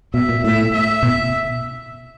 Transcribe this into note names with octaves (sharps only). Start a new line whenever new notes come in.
B2 E5
A#2
A2 E5
E5
B2